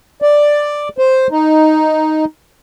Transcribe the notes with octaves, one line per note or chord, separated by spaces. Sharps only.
D5
C5
D#4